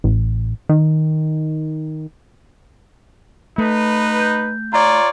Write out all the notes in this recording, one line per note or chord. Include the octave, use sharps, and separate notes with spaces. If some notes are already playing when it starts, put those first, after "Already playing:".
A1
D#3
A3 D#4 B4
G6
F4 C#5 D5 A#5